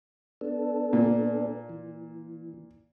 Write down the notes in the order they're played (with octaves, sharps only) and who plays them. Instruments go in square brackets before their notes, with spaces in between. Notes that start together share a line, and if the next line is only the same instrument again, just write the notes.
[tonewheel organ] B3 D4 A4
[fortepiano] A#2
[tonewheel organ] E3